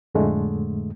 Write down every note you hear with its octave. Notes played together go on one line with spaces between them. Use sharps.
F2 A2 D3 G#3 A3